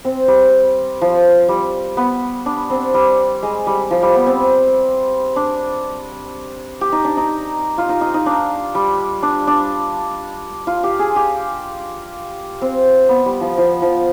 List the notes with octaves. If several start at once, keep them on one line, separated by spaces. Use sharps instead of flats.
C4
G3
F3
G3
B3
D4
C4
G3
G#3
G3
F3
G3
B3
C4
D4
G4
D#4
D4
D#4
F4
D#4
D#4
D#4
D4
G3
D4
D4
F4
G4
G#4
G4
C4
B3
G3
F3
F3
F3